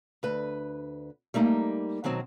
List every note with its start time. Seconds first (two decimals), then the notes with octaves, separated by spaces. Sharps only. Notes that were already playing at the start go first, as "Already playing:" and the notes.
0.23 D2 B4
1.34 G3 A3 A#3 D#4
2.04 B2 D#3 F#3 C4